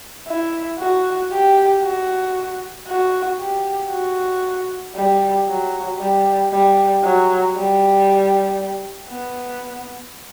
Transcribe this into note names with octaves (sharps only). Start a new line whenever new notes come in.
E4
F#4
G4
F#4
F#4
G4
F#4
G3
F#3
G3
G3
F#3
G3
B3